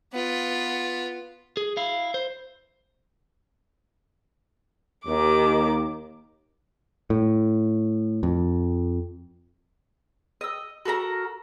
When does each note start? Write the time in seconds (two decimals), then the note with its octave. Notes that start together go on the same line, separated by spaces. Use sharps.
0.13 B3 F4
1.57 G#4
1.77 E4 F5
2.14 C5
5.07 D#2 D#3 D6
7.10 A2
8.23 F2
10.41 D#5 E6
10.85 F#4 A4 A#4 A#5